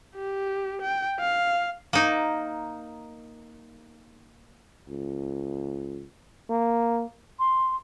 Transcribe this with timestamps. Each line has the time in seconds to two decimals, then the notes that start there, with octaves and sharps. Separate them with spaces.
0.16 G4
0.82 G5
1.20 F5
1.93 A#3 D#4
4.89 C#2
6.50 A#3
7.39 C6